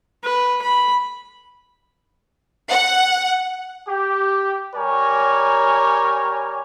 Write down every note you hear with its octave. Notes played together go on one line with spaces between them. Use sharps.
B4
B5
F#5
G4
G3 G4 A#4 C#5 G#5 A#5